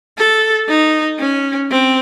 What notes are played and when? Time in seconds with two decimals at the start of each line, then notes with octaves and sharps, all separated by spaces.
0.18 A4
0.69 D#4
1.19 C#4
1.71 C4